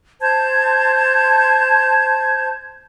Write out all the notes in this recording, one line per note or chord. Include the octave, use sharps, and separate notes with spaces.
C5 A5 G6 G#6